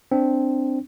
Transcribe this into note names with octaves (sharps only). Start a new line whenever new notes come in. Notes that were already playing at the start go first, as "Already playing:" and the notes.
C4 D4